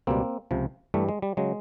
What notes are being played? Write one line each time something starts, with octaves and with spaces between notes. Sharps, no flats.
C#2 B2 G3 A#3 C4
C#2 C3 F3
G2 E3 G3 A3
G#3
G3
C#3 F#3 G#3